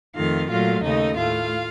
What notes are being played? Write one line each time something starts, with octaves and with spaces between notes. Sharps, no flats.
F2 D#3 A3 F4 F5
A#2 F#3 A3 F4 F5
D#2 C#3 A3 D#4 D#5
A2 A3 F4 F5